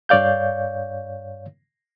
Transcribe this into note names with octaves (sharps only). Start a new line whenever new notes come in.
G2 C#5 D5 F5 G6